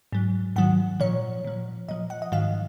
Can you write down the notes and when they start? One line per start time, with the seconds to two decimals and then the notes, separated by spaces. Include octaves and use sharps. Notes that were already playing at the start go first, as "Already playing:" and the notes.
0.13 G#2 F#3
0.56 G#2 D#3 F#3 F#5
1.00 A#2 F3 C#5
1.44 A#2 F3
1.89 A#2 F3 D#5
2.10 F#5
2.22 D#5
2.32 G#2 D#3 F#3 F5